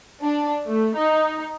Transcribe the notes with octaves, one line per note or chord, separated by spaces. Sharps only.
D4
A3
D#4